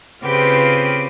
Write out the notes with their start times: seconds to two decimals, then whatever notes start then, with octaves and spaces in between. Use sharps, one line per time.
0.24 C#3 C4 F4 G4 B4